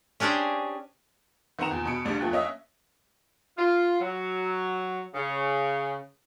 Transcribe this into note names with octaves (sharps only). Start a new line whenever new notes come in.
C#4 D4 G4 G#4 C5 G5
D#3 C4 B4 F#5 A#5 E7
E2 A#2
B2 B5 C#7 D7
A1 D2 C#3 G3 D4
E2 F3 A3 G5 F#6
A#3 C#4 D#5 E5
F4
F#3
C#3